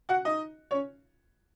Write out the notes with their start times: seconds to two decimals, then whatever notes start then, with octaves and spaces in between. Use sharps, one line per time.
0.09 F#4 F#5
0.25 D#4 D#5
0.71 C#4 C#5